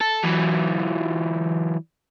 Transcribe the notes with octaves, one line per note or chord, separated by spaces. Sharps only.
A4
E3 F#3